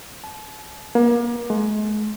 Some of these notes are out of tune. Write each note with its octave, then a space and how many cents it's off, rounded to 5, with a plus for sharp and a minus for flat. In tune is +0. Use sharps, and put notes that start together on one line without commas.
A5 -40
A#3 +35
G#3 +35